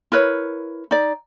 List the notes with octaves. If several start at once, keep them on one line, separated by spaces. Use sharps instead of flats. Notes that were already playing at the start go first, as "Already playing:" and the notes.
E4 A#4 B4 C#5
D#4 D5